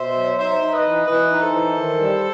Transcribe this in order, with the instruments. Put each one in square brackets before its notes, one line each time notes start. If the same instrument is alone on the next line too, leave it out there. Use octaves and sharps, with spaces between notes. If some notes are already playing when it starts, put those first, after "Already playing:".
Already playing: [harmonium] B2 [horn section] C5 E5
[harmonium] F#3
[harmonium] D#4 [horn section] C5 E5
[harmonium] D#4
[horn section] B4 D#5
[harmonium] E3
[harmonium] E3 [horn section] B4 D#5
[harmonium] D#4
[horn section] A4 C5
[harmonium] E3
D#3
G3